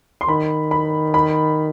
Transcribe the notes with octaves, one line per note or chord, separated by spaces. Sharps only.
C6
D#3 B5
B5
B5